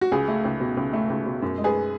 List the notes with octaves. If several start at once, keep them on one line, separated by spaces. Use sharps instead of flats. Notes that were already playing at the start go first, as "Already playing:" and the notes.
F#4
C#2 G#4
A3
C#2
B2
C#2
A3
C#2
B2
F#2
G#3
G#4 B4